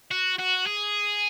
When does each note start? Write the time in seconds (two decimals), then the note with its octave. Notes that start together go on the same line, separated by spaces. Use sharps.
0.11 F#4
0.39 F#4
0.66 G#4